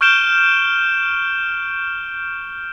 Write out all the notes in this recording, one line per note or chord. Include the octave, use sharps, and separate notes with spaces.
C#6 F6 G6 D7 E7 G7